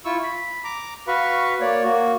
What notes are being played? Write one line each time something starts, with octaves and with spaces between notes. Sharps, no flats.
E4 F4 C#6 E6
B5
A#5 D6
F#4 B4 F5 B5 C#6
A#3 C#5 D5
A#3 F#4